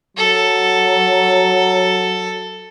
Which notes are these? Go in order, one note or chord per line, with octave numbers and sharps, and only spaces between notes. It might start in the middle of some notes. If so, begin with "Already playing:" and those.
F#3 A4